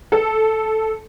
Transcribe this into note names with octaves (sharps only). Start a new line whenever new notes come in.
A4